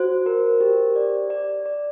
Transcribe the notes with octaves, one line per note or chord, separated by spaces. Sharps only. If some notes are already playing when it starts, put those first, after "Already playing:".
Already playing: F#4 C5
A#4
G4
D5
D5
D5